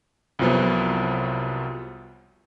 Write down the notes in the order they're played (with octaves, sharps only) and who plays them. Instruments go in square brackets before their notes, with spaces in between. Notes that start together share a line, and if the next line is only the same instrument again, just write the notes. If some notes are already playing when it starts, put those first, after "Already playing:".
[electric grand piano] C2 F2 C3 F3 F#3 B3